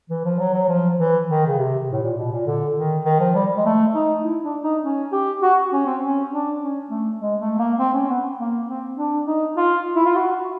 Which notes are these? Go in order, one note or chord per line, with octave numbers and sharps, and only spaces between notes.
E3
F3
F#3
F#3
F3
E3
D#3
C#3
C3
A2
A#2
B2
A#2
D3
D#3
D#3
F3
G3
G#3
A3
D#4
E4
D4
D#4
C#4
G4
F#4
C#4
C4
C#4
D4
C#4
A3
G#3
A3
A#3
C4
C#4
B3
A#3
C4
D4
D#4
F4
E4
F4
F#4